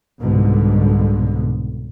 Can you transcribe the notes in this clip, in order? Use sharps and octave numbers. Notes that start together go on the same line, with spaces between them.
C2 G#2 B2 D3